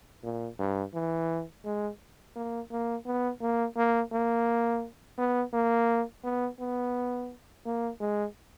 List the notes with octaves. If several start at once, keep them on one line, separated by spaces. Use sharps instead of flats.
A#2
G2
E3
G#3
A#3
A#3
B3
A#3
A#3
A#3
B3
A#3
B3
B3
A#3
G#3